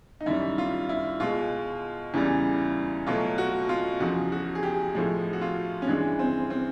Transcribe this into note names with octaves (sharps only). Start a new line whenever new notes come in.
D#4
F#2 D#3 G3 E4
F4
E4
B2 G#3 F4
E2 C#3 E3 G3
B2 F#3 A3 F4
F#4
F4
E2 C#3 F3 F#4
F#4
G#4
G4
A2 F3 G#3
F#4
F4
C#4
G2 E3 G#3 D4
C4
C4